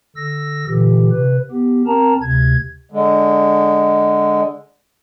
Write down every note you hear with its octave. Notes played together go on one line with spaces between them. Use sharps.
D3 E6 A#6
A#2 D3 E3 G4
C3 B4
B3 G4
C4 A#4 A5 A#5
D2 C3 G#6
D3 G#3